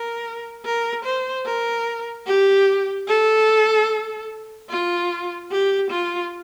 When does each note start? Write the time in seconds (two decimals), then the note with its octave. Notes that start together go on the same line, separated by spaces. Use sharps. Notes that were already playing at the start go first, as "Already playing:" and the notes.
Already playing: A#4
0.65 A#4
1.05 C5
1.46 A#4
2.26 G4
3.08 A4
4.70 F4
5.51 G4
5.90 F4